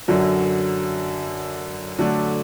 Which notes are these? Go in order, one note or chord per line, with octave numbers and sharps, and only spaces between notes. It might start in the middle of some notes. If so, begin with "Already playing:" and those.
F#2 D3 F#3
D3 F#3 A3 D4